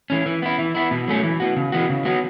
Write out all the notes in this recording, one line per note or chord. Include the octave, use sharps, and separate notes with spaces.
E3 C#4
E3
B3 E4
E3
B3 E4
B2
F#3 A3 C#4
E3
B3 F#4
C#3
E3 B3 F#4
C#3
F#3 B3 F#4